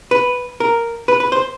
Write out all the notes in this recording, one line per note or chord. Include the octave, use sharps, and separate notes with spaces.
B4
A#4
B4
B4
C5